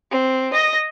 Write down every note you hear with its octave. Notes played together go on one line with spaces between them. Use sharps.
C4
D#5 A#6